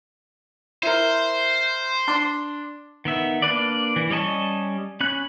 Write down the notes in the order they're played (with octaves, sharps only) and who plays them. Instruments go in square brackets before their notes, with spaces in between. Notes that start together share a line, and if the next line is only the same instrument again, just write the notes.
[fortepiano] E4 A#4 [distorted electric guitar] C5
[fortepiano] D4 C6
[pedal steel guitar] D#3 B3 E5
A#3 D4 B4 D5
E3
G3 C#4 D#5 A5 C#6
C#4 B5 F#6